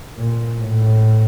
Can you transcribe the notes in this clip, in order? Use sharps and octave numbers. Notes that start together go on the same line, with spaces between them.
A#2
A2